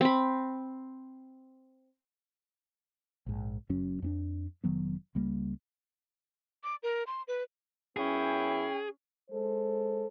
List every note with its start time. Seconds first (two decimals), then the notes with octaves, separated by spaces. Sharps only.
0.01 C4 B5
3.26 A#1 G#2
3.69 F#1 F#2 F#3 C#4
4.02 F2 B3 D4
4.64 F1 D#3 F#3 B3
5.15 C#2 G3 A#3
6.64 D6
6.83 A#4
7.07 C6
7.28 B4
7.97 F#2 B3 C#4 E4 G#4 G5
9.30 G#3 A4 C5